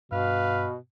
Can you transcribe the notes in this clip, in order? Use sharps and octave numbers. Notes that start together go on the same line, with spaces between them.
G2 B2 B4 F5